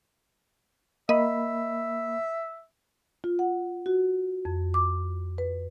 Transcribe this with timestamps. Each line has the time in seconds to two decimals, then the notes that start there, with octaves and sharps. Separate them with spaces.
1.09 A#3 D#5 E5 B5
3.24 F4
3.39 F#5
3.86 F#4
4.45 F2
4.74 D6
5.38 B4